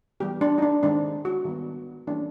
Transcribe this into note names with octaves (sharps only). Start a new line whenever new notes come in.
E3 G3 B3 G4
D4
D#4
D4
D#3 G#3 C4 D4
F#4
D#3 G3 B3
E3 G3 A#3 C#4 D4